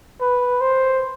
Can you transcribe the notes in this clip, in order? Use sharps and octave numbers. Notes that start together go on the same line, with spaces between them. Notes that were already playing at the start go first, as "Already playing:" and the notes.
B4
C5